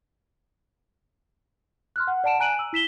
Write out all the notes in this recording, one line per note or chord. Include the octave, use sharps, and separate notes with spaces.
C6 F6 F#6
F#5
D5 F#5 A5 D7 E7
G#5 A#5 F#6 D7 D#7 F#7
E6
E4 B6 E7 G7